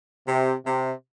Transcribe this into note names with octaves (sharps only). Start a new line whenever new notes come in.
C3
C3